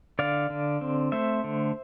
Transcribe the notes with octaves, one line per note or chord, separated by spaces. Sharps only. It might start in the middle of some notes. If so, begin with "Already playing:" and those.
D3 D5 F5
D3
C4
A3 C5 E5
D3